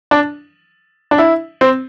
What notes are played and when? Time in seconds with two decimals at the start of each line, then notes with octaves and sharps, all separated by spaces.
0.11 D4
1.11 D4
1.18 E4
1.61 C4